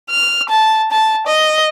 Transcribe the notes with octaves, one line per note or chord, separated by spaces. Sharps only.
F6
A5
A5
D#5